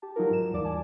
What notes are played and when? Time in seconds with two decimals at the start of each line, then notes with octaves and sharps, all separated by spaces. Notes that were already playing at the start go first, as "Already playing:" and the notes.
0.02 G4 A5
0.16 F#3 D#4 F4 A#4
0.30 G#2 E7
0.53 D#2 E3 G3 F4 D5 D6
0.64 G#5 A5